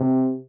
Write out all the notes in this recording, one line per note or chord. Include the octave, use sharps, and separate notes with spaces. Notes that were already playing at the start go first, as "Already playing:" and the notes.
Already playing: C3